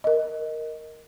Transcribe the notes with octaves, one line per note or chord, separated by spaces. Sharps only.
A#4 D#5